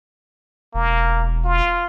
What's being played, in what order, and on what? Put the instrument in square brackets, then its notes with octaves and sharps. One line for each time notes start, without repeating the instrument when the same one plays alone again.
[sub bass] E1 [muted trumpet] A#3
[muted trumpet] F4